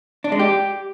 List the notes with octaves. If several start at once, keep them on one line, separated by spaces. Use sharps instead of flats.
D4
G#3
G4